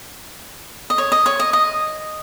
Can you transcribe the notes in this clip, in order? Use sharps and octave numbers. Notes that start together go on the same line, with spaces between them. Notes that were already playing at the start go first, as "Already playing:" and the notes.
D#5
C#5
D#5
C#5
D#5
D#5